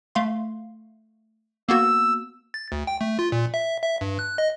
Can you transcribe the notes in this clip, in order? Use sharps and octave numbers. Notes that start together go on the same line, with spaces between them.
A3 F5 C6
A#3 B3 F#4 E6
A6
D2
G5
A3
F4
A#2
E5
E5
G2
F#6
D#5